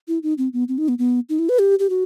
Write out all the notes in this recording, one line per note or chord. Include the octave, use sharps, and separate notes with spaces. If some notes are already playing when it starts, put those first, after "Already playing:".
E4
D#4
C4
B3
C4
D#4
B3
B3
D#4
E4
B4
G4
G4
F#4